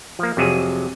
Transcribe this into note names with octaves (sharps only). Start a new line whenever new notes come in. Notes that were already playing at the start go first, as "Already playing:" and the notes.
F3 A#3
F2 C3 F#3 G#4